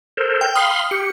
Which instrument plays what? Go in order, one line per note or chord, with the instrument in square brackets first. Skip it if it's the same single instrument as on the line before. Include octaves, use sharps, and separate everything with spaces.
[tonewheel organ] A4 A#4 C5
[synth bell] G5
[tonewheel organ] F5 B5 C6 [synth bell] D#6 F6
[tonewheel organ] G4 [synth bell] C#7